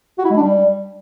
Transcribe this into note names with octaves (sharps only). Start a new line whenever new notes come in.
F#4
E4
G#3
D4
G3